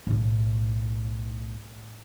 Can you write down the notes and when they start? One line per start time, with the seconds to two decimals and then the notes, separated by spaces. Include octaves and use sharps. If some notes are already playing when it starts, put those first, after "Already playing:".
0.07 B1 A2